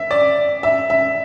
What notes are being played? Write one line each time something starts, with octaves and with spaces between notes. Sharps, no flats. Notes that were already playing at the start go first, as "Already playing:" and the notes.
Already playing: E5
D5
E5
E5